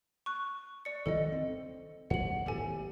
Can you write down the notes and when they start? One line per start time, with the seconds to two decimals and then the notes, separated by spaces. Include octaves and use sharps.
0.26 C#6 F#6
0.85 D5 C#7
1.06 D2 D#3 A4 D#5
1.32 C4
2.10 D#2 F#3 F#5 F#7
2.46 D1 G#1 E2 G4 A4 G#5